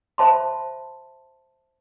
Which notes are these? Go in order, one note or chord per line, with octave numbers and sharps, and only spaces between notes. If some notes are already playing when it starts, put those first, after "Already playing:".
C5 E5 A5 B5 C6